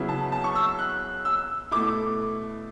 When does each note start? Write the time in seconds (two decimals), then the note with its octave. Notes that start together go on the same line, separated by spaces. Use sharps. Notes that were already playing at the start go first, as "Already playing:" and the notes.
Already playing: C#3 F#3 B3 E4
0.09 A5
0.32 A5
0.44 C#6
0.55 E6
0.79 F#6
1.25 E6
1.71 B2 A3 E4 D6